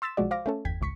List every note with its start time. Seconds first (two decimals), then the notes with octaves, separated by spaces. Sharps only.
0.02 C6 E6 A6 B6 E7
0.17 B1 F3 G#3 F#4 D5
0.31 C5 F5 D6 A#6
0.46 A3 C#4 A4
0.65 G1 E2 G5 G#6 B6
0.81 G#1 C#2 C#6 B6 C#7